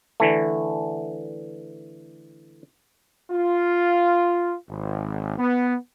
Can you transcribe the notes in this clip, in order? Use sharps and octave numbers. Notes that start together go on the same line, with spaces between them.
D3 E3 A3
F4
G#1
B3